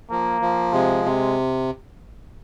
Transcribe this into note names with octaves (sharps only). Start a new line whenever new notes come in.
F3 A#3
F3
C3 G#3
C3